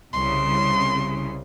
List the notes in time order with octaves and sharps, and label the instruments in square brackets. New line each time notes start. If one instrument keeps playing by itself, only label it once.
[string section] C2 C#3 [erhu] C6